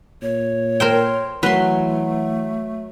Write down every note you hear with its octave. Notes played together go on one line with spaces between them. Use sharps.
A#2 C#5
A#4 C5 G5
E3 F#3 A3 B4 C6